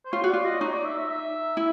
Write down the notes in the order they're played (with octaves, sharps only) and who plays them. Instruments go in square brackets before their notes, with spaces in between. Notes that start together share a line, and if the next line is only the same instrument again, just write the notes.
[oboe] C5
[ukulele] F4 [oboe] C#5
[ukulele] F#4
[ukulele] F4 [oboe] D5
[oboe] D#5
[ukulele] D#4 [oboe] C#5
[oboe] D5
E5
E5
E5
[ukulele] E4